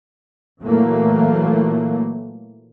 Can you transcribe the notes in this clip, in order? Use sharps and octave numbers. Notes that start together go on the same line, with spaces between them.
A#2 E3 F#3 A3 A#3